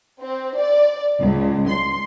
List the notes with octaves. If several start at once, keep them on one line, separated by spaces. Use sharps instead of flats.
C4
D5
C#2
C6